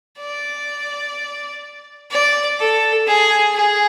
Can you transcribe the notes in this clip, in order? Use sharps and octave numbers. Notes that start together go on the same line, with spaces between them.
D5
D5
A4
G#4
G#4